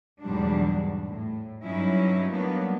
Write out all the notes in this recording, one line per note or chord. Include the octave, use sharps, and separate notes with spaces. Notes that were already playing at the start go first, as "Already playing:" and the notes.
E2 G#2 B2 F#3 G3 D4
A2
G2 F#3 C#4 D#4 E4
F#3 G3 A#3 B3 D4